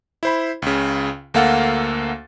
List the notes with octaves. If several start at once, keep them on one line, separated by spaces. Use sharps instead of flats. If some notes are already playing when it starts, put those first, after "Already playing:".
E4 C5 B5
C#2 C#3
D2 A#3 A4 F5 F#5 A6